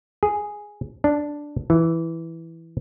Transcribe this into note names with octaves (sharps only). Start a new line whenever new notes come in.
G#4
D4
E3